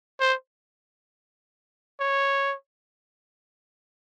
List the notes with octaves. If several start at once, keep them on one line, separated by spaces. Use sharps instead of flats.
C5
C#5